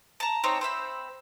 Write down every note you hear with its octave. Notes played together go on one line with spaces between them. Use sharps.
A5 A#5
C4 D#4 C#5 A#5
C4 C5 E5 B5